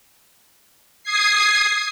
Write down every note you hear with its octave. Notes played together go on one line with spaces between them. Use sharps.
D#6 G#6 C7